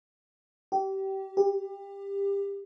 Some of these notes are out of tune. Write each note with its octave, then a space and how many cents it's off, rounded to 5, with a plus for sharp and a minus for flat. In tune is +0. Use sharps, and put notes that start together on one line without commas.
G4 -25
G4 +25